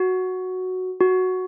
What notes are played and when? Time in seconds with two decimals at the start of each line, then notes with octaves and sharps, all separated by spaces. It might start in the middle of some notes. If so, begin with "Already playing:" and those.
Already playing: F#4
1.00 F#4